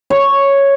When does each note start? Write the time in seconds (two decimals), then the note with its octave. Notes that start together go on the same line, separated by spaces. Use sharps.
0.10 C#5